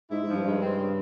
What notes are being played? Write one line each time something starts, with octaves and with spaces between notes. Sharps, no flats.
G#2 E4
G#2
G2 F3
G2 G#3
C4
C#3